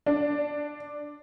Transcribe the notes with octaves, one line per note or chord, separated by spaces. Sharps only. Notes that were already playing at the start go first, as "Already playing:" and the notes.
D4